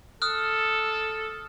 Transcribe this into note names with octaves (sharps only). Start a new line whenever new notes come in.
A4 D#6 F6 F#6